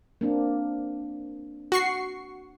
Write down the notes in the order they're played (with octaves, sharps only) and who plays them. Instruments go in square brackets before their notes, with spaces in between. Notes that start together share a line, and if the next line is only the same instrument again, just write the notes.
[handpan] A#3 C4 D4
[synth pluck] F#4 C#6 C7